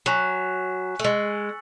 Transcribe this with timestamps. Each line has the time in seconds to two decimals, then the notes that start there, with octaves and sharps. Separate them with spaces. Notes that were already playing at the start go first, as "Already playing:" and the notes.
0.06 F#3 G#5 C#6 F#6 B6 E7
0.99 A3
1.04 G#3 C#6 E6 A6 C#7 F#7